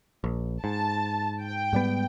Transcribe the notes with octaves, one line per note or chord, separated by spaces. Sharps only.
A#1
G#2 A5
G5
G#2 G3 B3